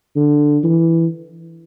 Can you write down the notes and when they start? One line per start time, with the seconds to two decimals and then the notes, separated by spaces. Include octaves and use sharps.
0.16 D3
0.64 E3